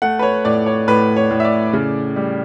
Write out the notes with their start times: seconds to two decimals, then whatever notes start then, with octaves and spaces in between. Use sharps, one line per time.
0.02 A3 F#5
0.19 B4
0.22 C#5
0.45 A2 D5
0.66 C#5
0.88 A2 B4
1.16 C#5
1.31 A2
1.40 E5
1.45 D5
1.73 C#3
2.16 G3